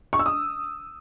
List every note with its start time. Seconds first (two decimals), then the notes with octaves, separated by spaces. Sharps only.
0.13 C#6
0.19 E6
0.26 D#6